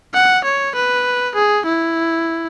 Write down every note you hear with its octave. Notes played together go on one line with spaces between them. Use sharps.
F#5
C#5
B4
G#4
E4